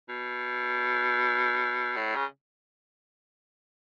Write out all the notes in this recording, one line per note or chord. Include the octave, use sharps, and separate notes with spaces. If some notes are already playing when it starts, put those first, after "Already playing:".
B2
A2
C#3